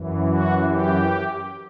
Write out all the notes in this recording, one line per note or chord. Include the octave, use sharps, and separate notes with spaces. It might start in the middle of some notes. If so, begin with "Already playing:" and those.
Already playing: F#2 E3
F#4
G4